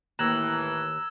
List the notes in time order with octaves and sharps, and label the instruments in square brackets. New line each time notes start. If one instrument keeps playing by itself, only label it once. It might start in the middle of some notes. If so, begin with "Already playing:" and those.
[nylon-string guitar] D#2 [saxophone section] A2 E3 [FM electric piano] A#5 F#6 [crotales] E6 G#6 E7